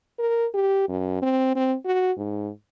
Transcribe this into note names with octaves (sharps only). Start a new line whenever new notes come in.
A#4
G4
F#2
C4
C4
F#4
G#2